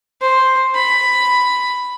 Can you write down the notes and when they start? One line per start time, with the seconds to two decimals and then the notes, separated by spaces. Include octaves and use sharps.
0.21 C5
0.75 B5